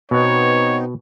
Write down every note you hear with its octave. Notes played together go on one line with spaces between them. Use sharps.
B2 B3 C4 D#4 C#5 F#5